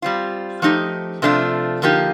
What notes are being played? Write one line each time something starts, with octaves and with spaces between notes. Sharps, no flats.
G3 C4 F4
F3 A3 D#4 G4
C3 F3 A3 D4 F4
D3 F3 A#3 D#4 G4